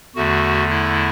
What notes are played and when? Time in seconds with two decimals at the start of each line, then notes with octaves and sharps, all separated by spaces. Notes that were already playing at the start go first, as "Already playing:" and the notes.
0.16 E2 D3 A3 F#4
0.70 E4